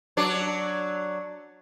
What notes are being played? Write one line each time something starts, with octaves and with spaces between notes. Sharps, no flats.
F#3 D4 D5